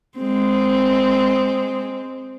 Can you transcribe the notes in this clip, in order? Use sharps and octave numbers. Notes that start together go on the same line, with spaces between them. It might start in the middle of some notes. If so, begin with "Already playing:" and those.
G#3 C4